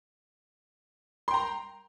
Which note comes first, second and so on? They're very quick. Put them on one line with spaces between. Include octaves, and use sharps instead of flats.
C6 G5 A#5